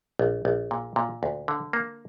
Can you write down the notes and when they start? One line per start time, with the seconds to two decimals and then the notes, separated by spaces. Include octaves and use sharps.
0.19 A#1
0.45 A#1
0.71 A#2
0.96 A#2
1.23 D2
1.48 D3
1.73 A#3